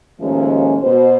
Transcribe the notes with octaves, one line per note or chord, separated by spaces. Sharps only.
D#2 A2 F3 G#3 C#4
B2 C5